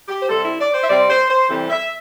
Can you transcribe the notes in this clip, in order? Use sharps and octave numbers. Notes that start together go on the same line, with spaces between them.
G4
C5
C3 G3 C4 A4
E4
D5
C5
E5
C3 G3 C4 D5
C5
C5
C3 E3 G3 C4 A4
E5